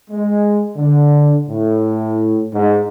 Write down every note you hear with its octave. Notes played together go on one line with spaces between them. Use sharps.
G#3
D3
A2
G#2